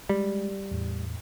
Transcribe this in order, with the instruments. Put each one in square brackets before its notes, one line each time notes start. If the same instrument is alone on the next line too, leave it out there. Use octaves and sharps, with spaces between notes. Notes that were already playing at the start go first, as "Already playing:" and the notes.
[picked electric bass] G3 [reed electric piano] G#3
[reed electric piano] E2 A2